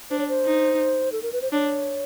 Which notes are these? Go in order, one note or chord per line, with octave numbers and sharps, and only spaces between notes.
D4 C5
C#5
C5
D#4
A4
A#4
B4
C5
D4 C#5